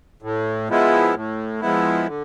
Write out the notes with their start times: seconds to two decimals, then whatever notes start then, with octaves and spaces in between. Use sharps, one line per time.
0.22 A2
0.68 F3 G#3 B3 E4
1.15 A2
1.61 F3 G#3 B3 E4
2.07 D3